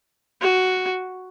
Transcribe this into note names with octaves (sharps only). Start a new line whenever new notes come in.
F#4